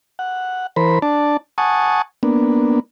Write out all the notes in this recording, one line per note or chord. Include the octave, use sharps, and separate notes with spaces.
F#5
E3 A#4 C5 B5
D4 D5 A5
F#5 G#5 A5 C#6 D#6
A#3 B3 D4